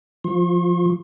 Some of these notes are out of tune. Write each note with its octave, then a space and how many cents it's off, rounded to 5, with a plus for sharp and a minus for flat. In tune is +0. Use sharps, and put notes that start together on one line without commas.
F3 +0 F4 +0 C6 +45